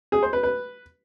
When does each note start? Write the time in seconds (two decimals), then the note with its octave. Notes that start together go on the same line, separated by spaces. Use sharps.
0.12 G#4
0.23 C5
0.33 B4
0.43 B4